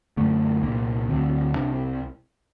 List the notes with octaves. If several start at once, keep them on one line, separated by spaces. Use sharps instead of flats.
F#2 D3 A3
C2 A#2 A#3
D2 D3 C4
C2 C3 D4